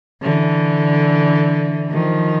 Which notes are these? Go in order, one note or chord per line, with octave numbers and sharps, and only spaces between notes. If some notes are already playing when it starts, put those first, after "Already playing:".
D3 E3
D#3 F3